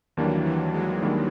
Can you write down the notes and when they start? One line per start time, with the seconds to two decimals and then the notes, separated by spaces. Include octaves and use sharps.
0.17 D#2 D#3 E3 F#3 G3 A#3 D4
0.45 E3 F#3
0.73 F#3 G#3
1.01 D#2 D#3 G3 A#3 D4